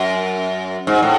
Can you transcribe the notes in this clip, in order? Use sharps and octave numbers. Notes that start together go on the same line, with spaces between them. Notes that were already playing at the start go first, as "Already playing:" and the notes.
Already playing: F#2
G#2
A2